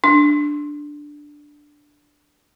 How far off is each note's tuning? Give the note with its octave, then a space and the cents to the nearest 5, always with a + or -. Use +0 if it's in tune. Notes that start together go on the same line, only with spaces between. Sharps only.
D4 +0